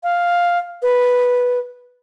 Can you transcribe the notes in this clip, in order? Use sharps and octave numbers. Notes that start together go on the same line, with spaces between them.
F5
B4